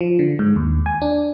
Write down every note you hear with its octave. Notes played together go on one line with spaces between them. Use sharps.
F3
D3
G#2
D#2
G#5
D4